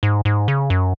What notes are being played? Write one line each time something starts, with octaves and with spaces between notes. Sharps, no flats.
G#2
G#2
C#3
F#2